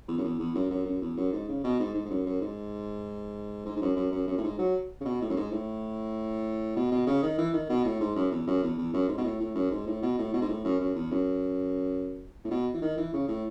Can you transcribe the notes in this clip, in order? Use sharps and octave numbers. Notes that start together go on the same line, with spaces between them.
E2
F#2
E2
E2
F#2
F#2
F#2
E2
F#2
G#2
C#3
B2
G#2
G#2
G#2
F#2
F#2
G#2
G#2
G#2
F#2
F#2
F#2
F#2
A2
G#2
F#3
C#3
B2
A2
F#2
G#2
A2
B2
B2
C#3
D#3
E3
D#3
B2
A2
G#2
F#2
E2
F#2
E2
E2
F#2
G#2
B2
A2
A2
F#2
G#2
A2
B2
A2
B2
G#2
A2
F#2
F#2
E2
F#2
A2
B2
E3
D#3
E3
C#3
A2